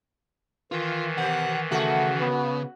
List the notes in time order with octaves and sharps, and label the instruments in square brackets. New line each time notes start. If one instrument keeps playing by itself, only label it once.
[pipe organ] D#3 E3 [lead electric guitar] F4
[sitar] B2 [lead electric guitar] F#5
[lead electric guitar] C#3 [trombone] A3 [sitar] F#4
[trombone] B3